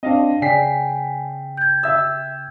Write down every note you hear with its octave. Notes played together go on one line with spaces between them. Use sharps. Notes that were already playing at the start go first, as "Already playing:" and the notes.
C4 D4 D#5 F5
C#3 D5 G5 G#5 B6 C7
G6 G#6
E5 E6